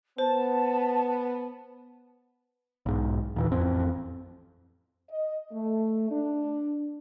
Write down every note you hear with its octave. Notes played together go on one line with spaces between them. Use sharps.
B3 C5 A5
B1 G#2
D#2 A#2 E3
A1 F2 C4
D#5
A3
D4